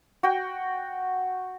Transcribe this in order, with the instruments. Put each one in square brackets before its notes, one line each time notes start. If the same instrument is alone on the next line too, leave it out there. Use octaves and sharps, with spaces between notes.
[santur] F#4 G5